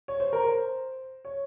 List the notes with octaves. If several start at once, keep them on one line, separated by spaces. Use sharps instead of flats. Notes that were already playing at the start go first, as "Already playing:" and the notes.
C#5
C5
A#4
C5
C#5